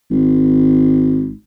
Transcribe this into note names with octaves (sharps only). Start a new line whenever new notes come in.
G#1